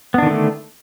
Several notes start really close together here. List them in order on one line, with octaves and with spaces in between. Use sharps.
B3 D4 D#3 D3 A3